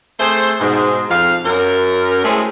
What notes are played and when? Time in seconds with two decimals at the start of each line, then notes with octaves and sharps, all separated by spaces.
0.20 A3 C4 G#4 C5
0.60 G#2 B2
1.10 F2 F5
1.45 F#2 A#4
2.24 G#3 A3 C4 C#4 E4 G#4